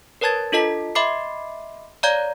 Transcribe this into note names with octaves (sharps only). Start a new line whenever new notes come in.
A#4 B4 C#5 A5 G#6 A6
D4 F4 A4 D#5 A5 B6
D#5 E5 B5 C6 D6 C7
C#5 D5 F5 A#5 G6 G#6